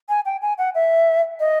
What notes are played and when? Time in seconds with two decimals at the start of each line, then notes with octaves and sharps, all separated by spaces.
0.09 G#5
0.25 G5
0.42 G#5
0.58 F#5
0.75 E5
1.40 D#5